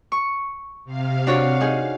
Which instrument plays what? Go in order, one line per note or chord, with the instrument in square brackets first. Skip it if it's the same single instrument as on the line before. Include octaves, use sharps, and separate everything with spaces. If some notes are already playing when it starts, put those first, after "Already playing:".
[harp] C#6
[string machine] C3 F5
[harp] D4 F#4 C#5
D#4 G#4